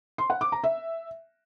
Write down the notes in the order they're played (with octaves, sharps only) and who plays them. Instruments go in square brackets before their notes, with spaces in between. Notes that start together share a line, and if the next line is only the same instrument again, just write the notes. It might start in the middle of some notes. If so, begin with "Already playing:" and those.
[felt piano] C6
F#5
D6
A#5
E5